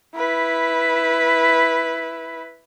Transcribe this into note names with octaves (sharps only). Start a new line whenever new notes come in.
E4 B4